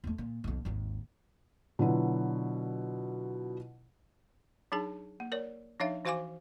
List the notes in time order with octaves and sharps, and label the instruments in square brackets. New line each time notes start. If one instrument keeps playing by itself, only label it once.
[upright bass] E2 A3
A#2
B1 F2
G#1 D#2
[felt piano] B2 D3 F#3 E4 F4
[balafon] F#3 D4 D#4 G#4 A5
A#3
A#4 C#5 D5
F3 D4 D#4 C#5 E5 F5
E3 F#4 C5 F5 G#5 D6